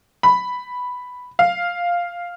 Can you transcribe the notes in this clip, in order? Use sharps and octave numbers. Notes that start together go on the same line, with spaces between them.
B5
F5